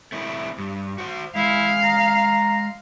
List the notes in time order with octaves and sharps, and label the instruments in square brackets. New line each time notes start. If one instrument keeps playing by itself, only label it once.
[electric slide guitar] A3 C4 E4
G2
F#4 C5
[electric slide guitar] G#3 [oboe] E4 [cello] F5
[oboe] A#5